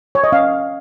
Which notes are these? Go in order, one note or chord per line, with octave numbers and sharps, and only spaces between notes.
C#5
D#5
C#4 F5